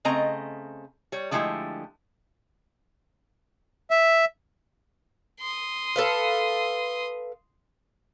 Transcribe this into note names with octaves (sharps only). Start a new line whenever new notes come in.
C#3 A3 C4 D#5 A#5
G3 C#5
D3 F3 G#3 A3 E4 G4
E5
C6 D#6
A4 B4 F5